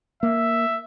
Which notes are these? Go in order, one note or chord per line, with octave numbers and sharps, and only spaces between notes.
A#3 E5